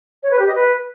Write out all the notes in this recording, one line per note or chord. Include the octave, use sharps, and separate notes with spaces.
C#5
B4
G4
D#5
B4